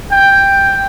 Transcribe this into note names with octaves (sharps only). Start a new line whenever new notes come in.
G5